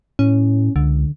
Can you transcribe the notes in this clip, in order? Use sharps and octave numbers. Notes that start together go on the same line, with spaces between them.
A2 C#4
C#2 D3